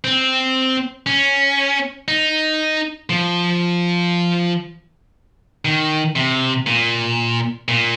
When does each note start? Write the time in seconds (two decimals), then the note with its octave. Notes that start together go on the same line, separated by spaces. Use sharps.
0.04 C4
1.07 C#4
2.08 D#4
3.10 F3
5.65 D#3
6.16 C3
6.67 A#2
7.68 A#2